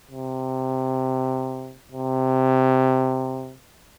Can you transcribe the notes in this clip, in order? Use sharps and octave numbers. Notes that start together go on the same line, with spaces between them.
C3
C3